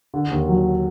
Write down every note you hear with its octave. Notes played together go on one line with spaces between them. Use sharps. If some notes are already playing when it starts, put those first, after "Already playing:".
D3
D#2
F#3